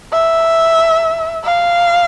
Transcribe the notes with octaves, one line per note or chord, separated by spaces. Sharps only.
E5
F5